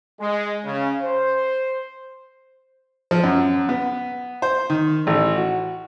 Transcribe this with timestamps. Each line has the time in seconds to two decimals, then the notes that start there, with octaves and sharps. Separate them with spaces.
0.20 G#3
0.65 C#3
1.02 C5
3.11 F3
3.24 F#2
3.69 B3
4.42 C5
4.70 D#3
5.07 A1
5.36 F#4